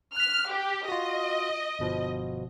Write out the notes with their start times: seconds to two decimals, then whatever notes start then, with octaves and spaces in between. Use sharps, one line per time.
0.16 F6 F#6 B6
0.51 G4
0.88 F4 F#4 D#5
1.79 G1 B2 F3